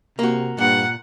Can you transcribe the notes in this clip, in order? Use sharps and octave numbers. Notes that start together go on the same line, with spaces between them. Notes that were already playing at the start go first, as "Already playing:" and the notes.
C3 A#3 F#4
G2 A#2 F#5